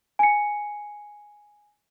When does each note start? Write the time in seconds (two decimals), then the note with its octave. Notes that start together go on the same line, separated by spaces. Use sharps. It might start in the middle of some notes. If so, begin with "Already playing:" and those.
0.19 G#5 C#7